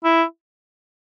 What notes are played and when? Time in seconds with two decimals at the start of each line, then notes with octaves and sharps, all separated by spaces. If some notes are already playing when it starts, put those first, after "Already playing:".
0.04 E4